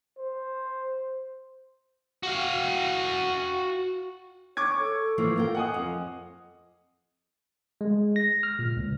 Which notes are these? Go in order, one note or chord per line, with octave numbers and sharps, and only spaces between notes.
C5
F#4 F5
C#5 C#6 D6 G#6
A4
E3 F3 A#3
F4 A#4 G5
D#5 F#5 G#5 D#6
F2
G#3
A#6
F6
A#2
C#2